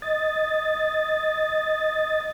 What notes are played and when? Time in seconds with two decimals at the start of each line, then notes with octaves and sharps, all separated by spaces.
0.02 D#5 A6